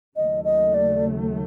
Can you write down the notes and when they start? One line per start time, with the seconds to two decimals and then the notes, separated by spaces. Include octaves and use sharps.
0.16 D#2 C#3 F#3 A3 D#5
0.44 D#5
0.74 D5